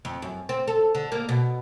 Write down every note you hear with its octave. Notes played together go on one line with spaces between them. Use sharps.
F2
F#2
C4
A4
D3
A#3
B2